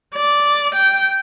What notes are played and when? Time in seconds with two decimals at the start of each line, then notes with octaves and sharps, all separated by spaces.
0.15 D5
0.75 G5